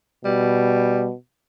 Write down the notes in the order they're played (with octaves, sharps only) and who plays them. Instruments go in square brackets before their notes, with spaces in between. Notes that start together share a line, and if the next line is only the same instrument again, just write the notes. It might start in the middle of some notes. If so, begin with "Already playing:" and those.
[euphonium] B2 [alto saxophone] G3